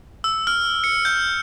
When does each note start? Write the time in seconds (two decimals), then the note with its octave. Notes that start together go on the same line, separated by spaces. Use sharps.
0.24 E6
0.47 F6
0.84 C#7
1.05 G6